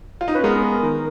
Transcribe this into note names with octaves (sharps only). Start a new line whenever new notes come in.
F4
D#4
C#4 B4
G#3 B3 A#4
D#3